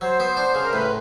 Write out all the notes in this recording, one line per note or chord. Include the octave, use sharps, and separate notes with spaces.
F#3 C5
B3
D4
C#3
A#4
A2 B4